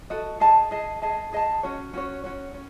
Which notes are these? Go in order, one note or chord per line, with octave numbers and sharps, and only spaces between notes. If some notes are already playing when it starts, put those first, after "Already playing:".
F#4 A4 D#5
G#4 D#5 A5
G#4 D#5 A5
G#4 D#5 A5
G#4 D#5 A5
C#4 F#4 C#5
C#4 F#4 C#5
C#4 F#4 C#5
C#4